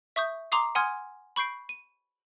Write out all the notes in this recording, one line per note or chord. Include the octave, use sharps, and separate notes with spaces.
E5 C#6 D#6 G6
A#5 C6 D6 D#6 C7
F#5 G#5 C6 D#6 F6 G#6
B5 C#6 G6 C7 D7
D#7